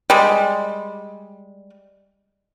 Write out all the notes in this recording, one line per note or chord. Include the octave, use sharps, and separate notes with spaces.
G3 G#3